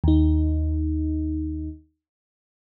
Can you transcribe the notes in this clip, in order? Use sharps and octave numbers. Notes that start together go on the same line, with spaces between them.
D#2 D#4